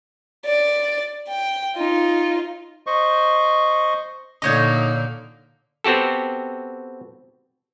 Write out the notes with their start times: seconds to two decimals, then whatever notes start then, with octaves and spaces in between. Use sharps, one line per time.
0.45 D5
1.28 G5
1.77 D#4 F4
2.87 C5 D#5 C#6
4.42 A#2 D3 A#3 D#4 C#5 D#5
5.84 B3 C4 F#4 G4 A4